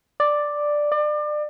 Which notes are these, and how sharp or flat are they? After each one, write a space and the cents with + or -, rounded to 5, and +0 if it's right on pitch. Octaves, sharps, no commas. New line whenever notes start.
D5 +5
D5 +30